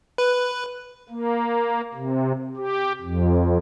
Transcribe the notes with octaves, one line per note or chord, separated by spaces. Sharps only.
B4
A#3
C3
G4
F2